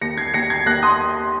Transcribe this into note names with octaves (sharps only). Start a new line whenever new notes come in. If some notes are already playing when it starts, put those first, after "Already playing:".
D#2 A#6 C#7
G#6 C7
D#2 A#6 C#7
G#6 C7
D#2 F#6 A#6
C6 D#6